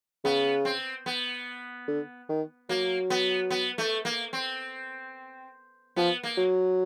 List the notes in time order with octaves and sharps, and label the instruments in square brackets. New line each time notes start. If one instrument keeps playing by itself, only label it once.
[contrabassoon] C#3 [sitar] B3
[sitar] C4
B3
[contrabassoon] D3
D#3
[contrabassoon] F#3 [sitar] A#3
[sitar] B3
B3
A3
A#3
C4
[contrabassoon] F3 [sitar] B3
[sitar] A#3
[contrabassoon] F#3